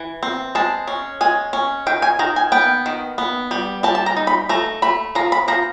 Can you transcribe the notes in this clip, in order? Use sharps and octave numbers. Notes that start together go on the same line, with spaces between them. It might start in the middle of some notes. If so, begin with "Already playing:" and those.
Already playing: E3
C4
G#3 A5
C#4
G#3 G#5
C#4
D#3 G5
G#5
D#3 A#5
G#5
B3 G5
D#3
B3
G3
G3 A5
A5
A#5
D#4
B5
A3 A#5
A3 B5
F3 A#5
B5
F3 A#5